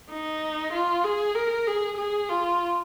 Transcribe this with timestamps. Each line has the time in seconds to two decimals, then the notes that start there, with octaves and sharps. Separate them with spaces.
0.11 D#4
0.73 F4
1.04 G#4
1.35 A#4
1.67 G#4
1.97 G#4
2.29 F4